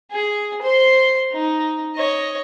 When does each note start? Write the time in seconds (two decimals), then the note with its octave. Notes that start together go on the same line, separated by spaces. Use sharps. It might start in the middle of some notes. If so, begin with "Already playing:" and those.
0.11 G#4
0.62 C5 C6
1.32 D#4
1.96 C#5 D#5